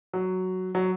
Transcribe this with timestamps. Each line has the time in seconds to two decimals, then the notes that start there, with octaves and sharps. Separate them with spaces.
0.13 F#3
0.75 F#3